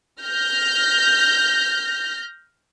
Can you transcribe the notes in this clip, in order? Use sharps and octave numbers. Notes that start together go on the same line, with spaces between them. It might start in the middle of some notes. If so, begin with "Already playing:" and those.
F6 G6 A#6